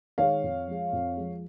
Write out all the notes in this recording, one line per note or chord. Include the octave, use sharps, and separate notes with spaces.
D#3 G#3 C#5 F5
F2
F3 G#3
F2
F3 G#3